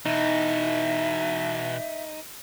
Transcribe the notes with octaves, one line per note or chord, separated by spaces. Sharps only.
B2 E3 D#4 E5